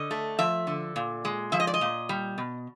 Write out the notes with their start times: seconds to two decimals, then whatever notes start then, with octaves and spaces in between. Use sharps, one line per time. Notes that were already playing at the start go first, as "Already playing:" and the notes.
Already playing: D3 D#5
0.11 A3
0.39 F3 E5
0.67 D3
0.96 A#2
1.25 G#3
1.52 F3 E5
1.60 D#5
1.67 D5
1.74 D#5
1.81 A#2
2.09 G3
2.38 B2